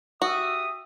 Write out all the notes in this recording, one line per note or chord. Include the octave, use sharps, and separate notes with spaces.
F#4 G4 E5 D#6